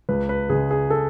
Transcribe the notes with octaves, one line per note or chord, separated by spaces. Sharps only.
C#2 B4
B4
C#3 G#3 G#4
G#4
A4